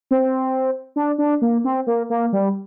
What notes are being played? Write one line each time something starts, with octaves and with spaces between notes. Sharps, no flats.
C4
D4
D4
A#3
C4
A#3
A#3
G3